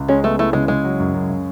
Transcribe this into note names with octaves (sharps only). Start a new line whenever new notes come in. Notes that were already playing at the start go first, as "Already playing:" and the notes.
Already playing: C#2
G#3 C#4
A3 B3
A3 E4
C#3 G#3
C#3 G#3
F#3
F#2
F#2
C#3